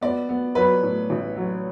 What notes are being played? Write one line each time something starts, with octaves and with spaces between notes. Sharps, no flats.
B3 D5
B3
F#3 B4
A2
A1
F#3